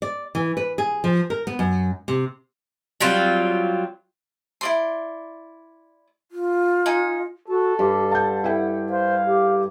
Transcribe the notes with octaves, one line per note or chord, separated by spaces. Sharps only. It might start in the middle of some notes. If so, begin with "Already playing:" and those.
D5
E3
B4
G#4
F3
A#4
B3
F#2
C3
F#3 G3 C4 F4
E4 D5 C6
F4
D#4 G#5
F#4 A4
G2 G4
F#5 A5 G6
E4 A4 G5
C5 F5
G4